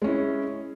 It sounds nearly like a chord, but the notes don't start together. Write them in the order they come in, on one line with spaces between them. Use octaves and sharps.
G#3 C#4 E4